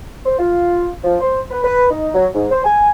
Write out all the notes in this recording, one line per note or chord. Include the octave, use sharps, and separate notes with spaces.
C5
F4
F3
C5
B4
B4
D#4
F#3
G#2
C5
G#5